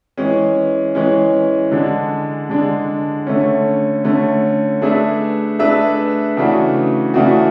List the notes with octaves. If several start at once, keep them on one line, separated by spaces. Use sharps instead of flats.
E3 G#3 C#4
E3 G#3 C#4
D3 G#3 D4
D3 G#3 D4
D3 A3 C#4
D3 A3 C#4
A3 D4 G#4 B4 E5
A3 D4 G#4 B4 E5
C#3 E3 A3 D4 F#4
C#3 E3 A3 D4 F#4